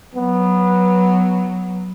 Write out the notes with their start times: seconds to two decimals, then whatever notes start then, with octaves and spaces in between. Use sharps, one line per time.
0.15 F#3 B3